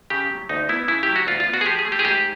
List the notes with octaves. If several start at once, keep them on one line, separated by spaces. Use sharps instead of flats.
C#3 G4
F#3
D2 D#4
B3 E4
C#3 E4
G4
F#3
F#4
D2 F4
F4
B3
F#4
G#4
F3 G4
G#4
A3
G4
G#4
G#2 G4